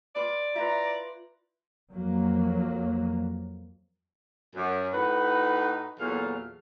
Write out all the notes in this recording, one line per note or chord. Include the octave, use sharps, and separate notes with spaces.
F4 B4 D5
E4 F4 B4 E5 A#5
F2 F#3 A#3
F#2
A2 D#4 F#4 B4
E2 A#2 F#3 A4 F5